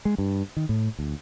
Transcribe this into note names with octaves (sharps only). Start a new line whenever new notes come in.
G#3
G2
D#3
A2
D2